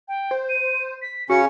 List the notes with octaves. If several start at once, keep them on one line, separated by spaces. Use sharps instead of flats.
G5
C5
D#7
B6
C#3 C#4 F#4 C#7